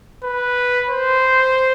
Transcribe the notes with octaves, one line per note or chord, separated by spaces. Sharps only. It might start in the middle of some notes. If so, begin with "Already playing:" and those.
B4
C5